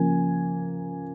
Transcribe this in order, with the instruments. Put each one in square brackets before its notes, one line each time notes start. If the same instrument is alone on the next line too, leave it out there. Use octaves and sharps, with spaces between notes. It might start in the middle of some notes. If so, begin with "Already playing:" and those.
Already playing: [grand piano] C#3 F3 A#3 G#5